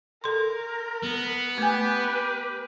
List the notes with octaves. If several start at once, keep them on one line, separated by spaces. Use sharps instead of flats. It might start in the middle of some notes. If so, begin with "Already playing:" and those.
A4 A#4 C6
B3
A3 G4 B4 G#5